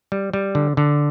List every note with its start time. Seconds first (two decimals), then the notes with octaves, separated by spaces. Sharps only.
0.12 G3
0.33 G3
0.55 D3
0.77 D3